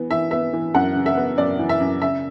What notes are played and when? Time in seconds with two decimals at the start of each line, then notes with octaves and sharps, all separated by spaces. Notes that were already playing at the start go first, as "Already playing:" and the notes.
Already playing: E3 B3
0.11 E3 E5
0.31 B3 E5
0.53 E3
0.74 F#2 F#5
0.95 C#3
1.06 E5
1.17 B3
1.38 F#2 D5
1.59 E3
1.69 E5
1.80 F#2
2.02 C#3 E5